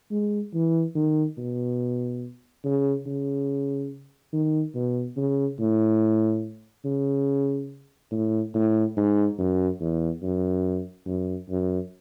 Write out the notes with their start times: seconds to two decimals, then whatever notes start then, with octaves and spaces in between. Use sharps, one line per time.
0.11 G#3
0.54 E3
0.95 D#3
1.38 B2
2.64 C#3
3.06 C#3
4.33 D#3
4.75 B2
5.17 C#3
5.59 A2
6.85 C#3
8.11 A2
8.55 A2
8.97 G#2
9.39 F#2
9.80 E2
10.22 F#2
11.06 F#2
11.49 F#2